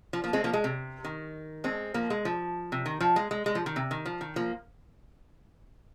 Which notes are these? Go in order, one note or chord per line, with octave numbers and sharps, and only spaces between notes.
F3
F3 A#3
G#3 C4
F3 A#3
G#3
C3
D#3
G#3 C4
F3 A#3
G#3
F3
C3
D#3
F3
G#3
G#3
G#3
F3
D#3
C3
D#3
F3
D#3
F3 A#3